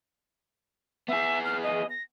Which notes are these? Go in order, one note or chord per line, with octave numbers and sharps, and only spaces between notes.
B3 G#4 E5
F6
D#5
A#6